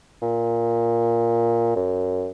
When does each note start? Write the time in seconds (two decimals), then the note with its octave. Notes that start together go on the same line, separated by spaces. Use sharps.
0.22 A#2
1.76 F#2